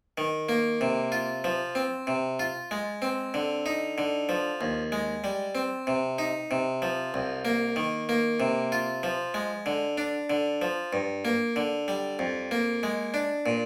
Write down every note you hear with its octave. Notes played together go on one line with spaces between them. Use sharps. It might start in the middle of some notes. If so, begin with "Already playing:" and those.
D#3
A#3
C3
F4
F3
C4
C3
F4
G#3
C4
D3
D#4
D3
F3
D#2
G#3
G3
C4
C3
D#4
C3
F3
C2
A#3
D#3
A#3
C3
F4
F3
G#3
D3
D4
D3
F3
G2
A#3
D3
G3
F2
A#3
G#3
D4
A#2